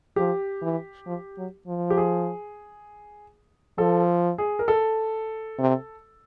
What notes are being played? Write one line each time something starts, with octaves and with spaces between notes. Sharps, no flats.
F3 G4
E3
F3
F#3
F3
G4
G#4
F3 A4
G#4
A#4
A4
C3